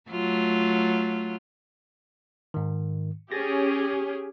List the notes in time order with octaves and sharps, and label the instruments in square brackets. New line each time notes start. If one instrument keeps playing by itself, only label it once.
[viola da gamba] F#3 A3 F4
[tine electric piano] G#2 D#3
[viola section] C#4 G4 G#4 [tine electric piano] A6 A#6